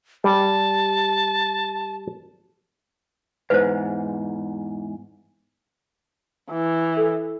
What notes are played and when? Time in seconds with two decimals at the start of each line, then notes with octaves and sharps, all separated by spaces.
0.24 G3 A5
3.50 E2 G#2 B4 C5
6.50 E3
6.97 A4